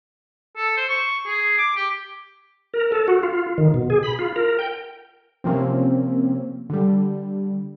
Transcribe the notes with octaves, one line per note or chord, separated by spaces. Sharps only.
A4
C5
C#6
G#4
D6
G4
A#4
A4
F#4
F4
D#3
B2
G#4
B5
F4
A#4
G5
C3 F3 A#3 C4 C#4
D3 G3